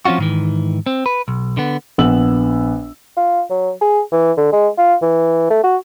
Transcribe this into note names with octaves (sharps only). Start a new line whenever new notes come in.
F3 C4 C#4 F4 F#4
G#2 D#3 E3
C4
B4
B1
D3 B3
A#1 B3 E6 F#7
F4
F#3
G#4
E3
D3
G#3
F4
E3
A3
F#4